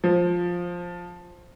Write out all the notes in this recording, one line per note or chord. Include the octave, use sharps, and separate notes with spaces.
F3